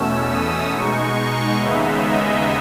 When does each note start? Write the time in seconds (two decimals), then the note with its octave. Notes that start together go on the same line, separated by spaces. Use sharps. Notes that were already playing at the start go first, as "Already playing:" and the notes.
Already playing: E2 B2 A3 C#4 E6
0.27 D#6
0.70 B2 G#3 D#4 C#6
1.58 D#2 C#3 G#3 B3 D#4 E5
2.01 D#5